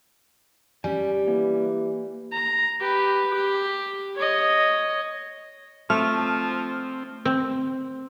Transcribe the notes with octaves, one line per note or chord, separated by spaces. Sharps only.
G3 C#4 G4 G#5
E3 A#3
A#5
G4 B4
G4
C#5 D#5
F3 A3 C4 F6
C4